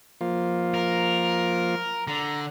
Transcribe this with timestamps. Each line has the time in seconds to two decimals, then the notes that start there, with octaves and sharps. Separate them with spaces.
0.21 F3 A#3 F4
0.74 A#4
2.07 D3 A#5